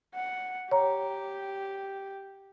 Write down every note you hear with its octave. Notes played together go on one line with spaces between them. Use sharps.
F#5
G4 C#5 A#5